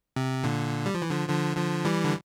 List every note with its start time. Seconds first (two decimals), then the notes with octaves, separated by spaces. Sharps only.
0.16 C3
0.44 A#2 D3
0.86 G3
0.94 F3
1.02 E3
1.10 D3 F3
1.29 D3 F3
1.57 D3 F3
1.85 E3 G3
2.04 D3